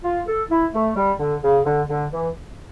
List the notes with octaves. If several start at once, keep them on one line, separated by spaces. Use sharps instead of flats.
F4
A4
E4
A3
G3
D3
C#3
D3
D3
E3